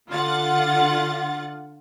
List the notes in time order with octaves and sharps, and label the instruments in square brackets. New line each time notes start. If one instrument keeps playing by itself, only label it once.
[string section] D3 F4 F#5 A6